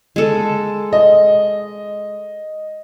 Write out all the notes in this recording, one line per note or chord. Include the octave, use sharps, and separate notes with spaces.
G#3 A4
D#5